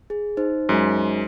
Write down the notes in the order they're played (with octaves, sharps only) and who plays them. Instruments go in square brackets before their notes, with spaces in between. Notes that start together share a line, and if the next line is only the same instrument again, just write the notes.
[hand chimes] G#4
D#4 C5
[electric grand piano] F#2 G#3